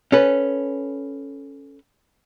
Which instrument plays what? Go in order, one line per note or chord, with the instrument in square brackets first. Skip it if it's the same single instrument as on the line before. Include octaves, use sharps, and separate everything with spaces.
[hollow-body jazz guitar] C#4 A4 B4